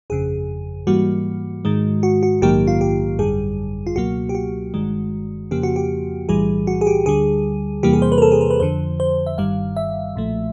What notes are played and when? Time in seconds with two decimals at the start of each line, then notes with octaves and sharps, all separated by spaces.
0.10 G1 F2 C#3 G#4
0.87 G#2 E3 G3 A#3 F#4
1.65 G#2 D#3 G#3
2.03 F#4
2.23 F#4
2.41 A#1 G#2 D#3 F#3 A#3 G4
2.67 F4
2.81 G4
3.19 G#1 F#2 D3 G3 G#4
3.87 F4
3.96 C#2 B2 F#3 A#3 F#4
4.29 G4
4.35 F#4
4.74 G1 G2 D#3 G#3
5.51 F2 C#3 F3 A#3 G4
5.63 F#4
5.76 G4
6.28 B1 A2 E3 G3 G#4
6.67 F#4
6.81 G#4
6.87 G4
7.06 D2 D3 G3 G#4
7.83 E2 C3 E3 G3 A#3 G4
7.93 G#4
8.02 C5
8.12 B4
8.18 A#4
8.22 A4
8.32 G#4
8.41 A#4
8.50 B4
8.60 F2 D3 F3 C5
9.00 C5
9.26 E5
9.38 G1 G2 D#3 G3 F5
9.77 E5
10.15 B1 A#2 F3 A3